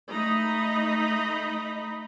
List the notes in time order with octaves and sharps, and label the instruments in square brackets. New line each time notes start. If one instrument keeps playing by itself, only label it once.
[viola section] A3 D#4 D#5 A#5 B5